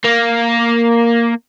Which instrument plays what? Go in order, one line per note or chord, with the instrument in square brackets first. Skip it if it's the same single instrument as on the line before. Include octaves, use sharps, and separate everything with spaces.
[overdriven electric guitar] A#3